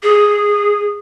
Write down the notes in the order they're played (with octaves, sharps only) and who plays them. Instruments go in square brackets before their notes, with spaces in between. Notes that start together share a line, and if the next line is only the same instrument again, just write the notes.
[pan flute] G#4